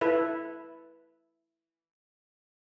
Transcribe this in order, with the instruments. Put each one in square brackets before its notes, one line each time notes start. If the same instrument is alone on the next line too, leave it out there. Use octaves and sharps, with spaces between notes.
[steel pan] E4 A4 B4 E5